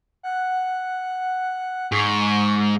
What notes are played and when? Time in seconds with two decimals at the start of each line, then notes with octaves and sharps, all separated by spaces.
0.23 F#5
1.92 G#2 C#6